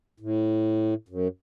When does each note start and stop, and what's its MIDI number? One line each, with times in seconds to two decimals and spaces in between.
0.20 0.94 45
1.09 1.28 42